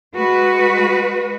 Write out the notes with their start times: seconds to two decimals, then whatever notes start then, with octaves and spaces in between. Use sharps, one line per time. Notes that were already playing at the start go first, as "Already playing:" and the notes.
0.15 G#3 F#4 B4